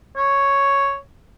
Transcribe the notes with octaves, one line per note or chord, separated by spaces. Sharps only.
C#5